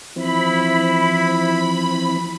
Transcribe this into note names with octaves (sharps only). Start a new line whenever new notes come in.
E3 F3 C4 E4 B5